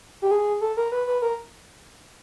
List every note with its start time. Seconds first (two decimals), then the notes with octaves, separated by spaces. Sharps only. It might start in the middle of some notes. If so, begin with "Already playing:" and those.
0.22 G4
0.31 G#4
0.61 A4
0.77 A#4
0.92 B4
1.07 B4
1.22 A#4